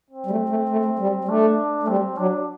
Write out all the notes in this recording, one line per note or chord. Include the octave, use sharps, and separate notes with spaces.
C4
G3
A3
A3
A3
A3
G3
G3
A3 D4
A3
G3 C4
F#3 D4